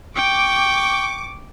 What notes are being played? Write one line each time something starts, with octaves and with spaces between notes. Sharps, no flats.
G5 C#6 D6